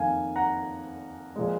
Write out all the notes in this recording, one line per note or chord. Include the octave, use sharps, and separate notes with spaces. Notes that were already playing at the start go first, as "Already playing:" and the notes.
Already playing: F2 D#3 A#3 F5 G#5
F#5 A#5
A#2 F3 G#3